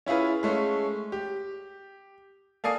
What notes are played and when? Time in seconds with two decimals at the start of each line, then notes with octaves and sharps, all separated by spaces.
0.06 C#4 E4 F4 G#4 B4
0.43 G#3 A3 C#4
1.12 G4
2.64 A#3 A4 D5 G#5 D#6 C7